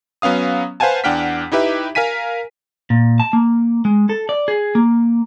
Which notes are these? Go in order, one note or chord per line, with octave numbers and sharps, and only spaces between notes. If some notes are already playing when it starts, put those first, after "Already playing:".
F#3 B3 C#4 F5 D#6
B4 C5 F5 F#5 G#5 A5
E2 D4 F#5 G5 F6 B6
D#4 E4 G4 B4 E5
A#4 F5 G#5 B6 D#7
A#2
A5
A#3
G#3
A4
D5
G#4
A#3